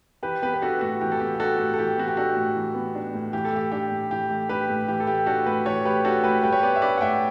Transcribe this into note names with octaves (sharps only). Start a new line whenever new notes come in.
E3 G4 B4
B3 G4 B4
B4
D4 F#4 A4
A2 F#4
E3 G4
A4
B3 G4
G4
D4 F#4 A4
A2 G4
A4
E3 G4
B3 F#4
G4
D4 F#4 A4
A2
E3
B3
D4
A2
E3 G4
A4
A3 G4
D4 G4
A2
E3 G4
A3
D4 G4 B4
A2
E3 G4
A4
A3 G4
D4 F#4 A4
A2 G4 B4
E3 A4 C#5
A3 G4 B4
D4 F#4 A4
A2 G4 B4
G3 G4 B4
C#5
B3 B4 D5
E5
D4 B4 D5
F#5
A2 E5 G5